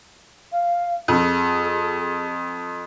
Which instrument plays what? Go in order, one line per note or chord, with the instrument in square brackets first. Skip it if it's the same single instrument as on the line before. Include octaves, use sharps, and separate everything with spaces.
[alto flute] F5
[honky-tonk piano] F2 [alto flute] G#4